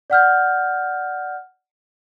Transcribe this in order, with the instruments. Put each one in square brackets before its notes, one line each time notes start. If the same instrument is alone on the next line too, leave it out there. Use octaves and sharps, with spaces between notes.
[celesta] D5 F#5 F6 G6